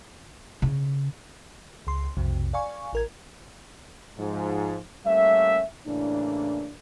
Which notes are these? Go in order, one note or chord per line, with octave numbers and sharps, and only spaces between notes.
C#3
C#2 C6
B1 F2 C3
D5 F5 G#5 C#6
A1 A#4 G#6
G#2 F3
G3 A3 A#3 C#4 E5
A2 C#3 E3 A#3 D4